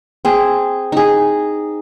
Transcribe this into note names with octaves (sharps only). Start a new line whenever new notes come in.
C4 G#4
D#4 G#4